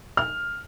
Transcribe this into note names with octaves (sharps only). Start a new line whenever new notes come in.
F6